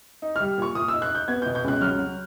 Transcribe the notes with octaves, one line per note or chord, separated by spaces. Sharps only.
D#4
G3 F6
A#2 C#6
A#2 D#6
D#4 E6
F#6
D#4 G6
B3 G#6
B2 G6
G6
C#2 F#6
F#3 F6
F#3